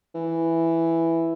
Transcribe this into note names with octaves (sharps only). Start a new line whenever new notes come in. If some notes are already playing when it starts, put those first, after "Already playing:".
E3